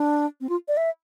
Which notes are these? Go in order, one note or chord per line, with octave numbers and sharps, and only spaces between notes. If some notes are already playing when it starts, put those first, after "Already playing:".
Already playing: D4
C4
F4
D5
E5